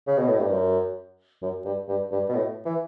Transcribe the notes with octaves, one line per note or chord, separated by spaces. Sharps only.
C#3
B2
A2
G2
F#2
F#2
G2
G2
G2
B2
A2
E3